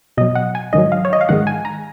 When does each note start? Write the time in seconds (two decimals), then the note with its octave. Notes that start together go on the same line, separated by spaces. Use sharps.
0.17 B2 F#3 D#5
0.35 F#5
0.55 G#5
0.73 G#2 D#3 F#3 D#5
0.92 F5
1.05 C#5
1.13 D#5
1.21 F5
1.29 G#2 D#3 G#3 F#5
1.47 G#5
1.65 A#5